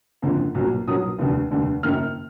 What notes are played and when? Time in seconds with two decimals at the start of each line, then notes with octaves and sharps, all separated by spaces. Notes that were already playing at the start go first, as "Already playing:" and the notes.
0.22 F#1 F2 D3 F3 A#3
0.55 B1 A#2 F#3 A#3
0.87 B1 A#2 F#3 A#3 D#6
1.18 F1 D#2 D3
1.51 F1 D#2 D3
1.83 F#1 F#2 D#3 A#3 F6